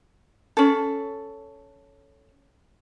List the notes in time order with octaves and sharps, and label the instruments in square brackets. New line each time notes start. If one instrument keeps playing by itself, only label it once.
[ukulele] C#4 A4